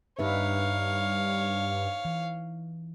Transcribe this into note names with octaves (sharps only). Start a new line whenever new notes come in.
G2 D#4 B4 C#5 E5 F5
E3